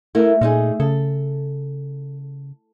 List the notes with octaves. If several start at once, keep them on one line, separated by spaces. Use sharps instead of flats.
A3 E4 A#4
A#2 A3 D#4 G#4
C#3 A4